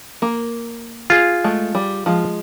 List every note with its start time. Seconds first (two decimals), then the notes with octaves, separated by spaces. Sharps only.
0.22 A#3
1.10 F4 G#4
1.44 G#3 A3
1.75 G3
2.06 F3 G#3